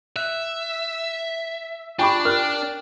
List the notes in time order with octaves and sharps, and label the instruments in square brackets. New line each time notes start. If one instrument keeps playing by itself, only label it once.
[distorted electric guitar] E5 [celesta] F#6
[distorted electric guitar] D4 [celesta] F4 C#6 D6 [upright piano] G5 B5
[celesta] A#4 G5 [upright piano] F6 F#6